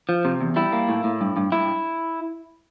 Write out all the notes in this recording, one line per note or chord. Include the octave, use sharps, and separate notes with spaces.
F3
C3
E2
G3 E4
A#3
A2
A2
G2
G2
G2 E4